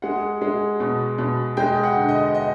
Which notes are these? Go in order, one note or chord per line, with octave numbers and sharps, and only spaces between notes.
G#3 F#5
G#3
B2
B2
G#3 G5
F#5
D3
D#5
D#5